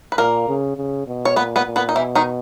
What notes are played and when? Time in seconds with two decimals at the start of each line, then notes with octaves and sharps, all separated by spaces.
0.12 B4
0.18 A#2 A#3 A#4
0.48 C#3
0.77 C#3
1.07 B2
1.25 C#5
1.36 A#2 B3 B4
1.56 B3 B4
1.66 A#2
1.76 B3 B4
1.89 D#4
1.96 B2 E3 E4
2.15 D#3 D#4